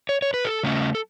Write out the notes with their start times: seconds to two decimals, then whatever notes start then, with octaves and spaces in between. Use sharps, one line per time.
0.09 C#5
0.22 C#5
0.34 B4
0.45 A4
0.63 C#3 A3 C#4
0.95 A4